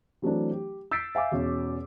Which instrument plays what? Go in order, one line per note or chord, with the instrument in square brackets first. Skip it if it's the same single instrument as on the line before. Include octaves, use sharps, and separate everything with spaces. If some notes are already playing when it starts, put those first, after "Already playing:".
[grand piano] E3 F#3 A3 C4 D4
G4
E6 G6 A6 B6 C7 D7
E5 F5 G#5 D6
E2 B2 C#4